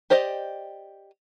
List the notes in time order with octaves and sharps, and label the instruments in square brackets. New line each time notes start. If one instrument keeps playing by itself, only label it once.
[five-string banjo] G4 C5 D5 D#5 G5